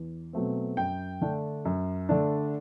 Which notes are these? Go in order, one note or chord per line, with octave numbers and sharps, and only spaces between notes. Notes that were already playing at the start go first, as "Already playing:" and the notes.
Already playing: E2
B2 F#3 A3 C4
F#2 G5
D3 A3 D4
F#2
D3 A3 D4